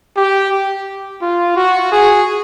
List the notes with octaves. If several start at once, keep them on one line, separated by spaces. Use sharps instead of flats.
G4
F4
F#4
G#4